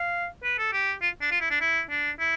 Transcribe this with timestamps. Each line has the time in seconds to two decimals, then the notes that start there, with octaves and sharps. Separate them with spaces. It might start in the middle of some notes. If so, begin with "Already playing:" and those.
Already playing: F5
0.43 B4
0.58 A4
0.73 G4
1.02 F4
1.21 D4
1.31 F4
1.41 E4
1.51 D4
1.61 E4
1.90 D4
2.19 E4